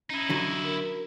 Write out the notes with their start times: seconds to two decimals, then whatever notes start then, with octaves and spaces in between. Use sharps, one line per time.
0.10 C#4 D#4 E4
0.30 D3 F#3
0.64 A#4